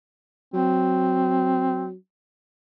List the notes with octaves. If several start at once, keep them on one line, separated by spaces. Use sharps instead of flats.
F#3 C4